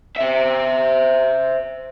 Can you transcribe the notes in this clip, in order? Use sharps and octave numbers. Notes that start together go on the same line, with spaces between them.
C5 E5